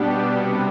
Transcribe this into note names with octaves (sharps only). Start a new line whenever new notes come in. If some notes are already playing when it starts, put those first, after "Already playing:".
Already playing: B2 G3 B3 D4 G4
C3 G3 B3